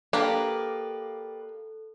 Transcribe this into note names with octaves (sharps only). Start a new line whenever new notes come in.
A#3 D4 G4 A4 B4 D5